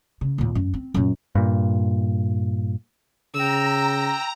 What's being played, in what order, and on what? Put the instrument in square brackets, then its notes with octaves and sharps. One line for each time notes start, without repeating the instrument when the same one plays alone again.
[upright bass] C#3
D#2 A#2
F#2
C4
F#2 A#2
[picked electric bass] G2 A#2
[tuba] C#3 [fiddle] G5 E6 [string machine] A#5